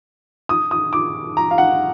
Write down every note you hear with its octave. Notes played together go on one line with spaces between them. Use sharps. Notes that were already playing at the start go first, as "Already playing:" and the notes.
D#6
D#6
D6
A#5
F5
F#5